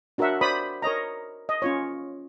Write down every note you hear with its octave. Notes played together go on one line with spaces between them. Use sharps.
D4 F#4 A#4 C#5 E5 F#5
C5 D5 B5 D#6
A#4 C#5 D#5 A#5
D#5
C#4 F4 C#5